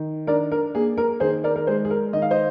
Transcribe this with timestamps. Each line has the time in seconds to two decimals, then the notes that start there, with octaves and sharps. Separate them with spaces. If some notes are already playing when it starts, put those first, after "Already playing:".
Already playing: D#3
0.27 D4 A#4 D5
0.52 A#4
0.75 A#3 G#4
0.98 A#4
1.20 D#3 G#4 C5
1.44 A#4 D5
1.56 A#4
1.67 G#3 G#4 C5
1.85 G#4
1.90 A#4
2.13 D#3 D#5
2.22 F5
2.31 C5 D#5